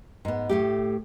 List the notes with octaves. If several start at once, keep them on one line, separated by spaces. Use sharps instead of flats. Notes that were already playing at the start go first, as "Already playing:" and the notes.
G#2 B3
A2 A3 G4